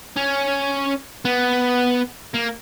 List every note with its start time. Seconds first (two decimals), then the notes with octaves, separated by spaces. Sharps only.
0.17 C#4
1.25 B3
2.34 A#3